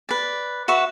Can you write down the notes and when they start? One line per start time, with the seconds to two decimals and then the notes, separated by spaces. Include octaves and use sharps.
0.09 B4 D5
0.68 F#4 B4 E5 C#6